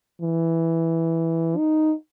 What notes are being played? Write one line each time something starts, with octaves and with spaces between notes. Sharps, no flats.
E3
D#4